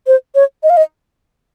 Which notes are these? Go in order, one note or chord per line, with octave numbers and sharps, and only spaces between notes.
C5
C#5
D#5
F5
D#5